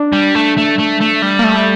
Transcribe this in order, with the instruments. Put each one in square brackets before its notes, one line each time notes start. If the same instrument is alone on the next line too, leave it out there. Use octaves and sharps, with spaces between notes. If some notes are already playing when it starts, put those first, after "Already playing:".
Already playing: [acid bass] D4
[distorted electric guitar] G3
A3
A3
A3
A3
G3
[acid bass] A#3
A3